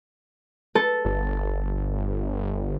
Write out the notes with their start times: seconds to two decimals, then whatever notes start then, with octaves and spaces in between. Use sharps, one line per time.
0.75 A4
1.05 G1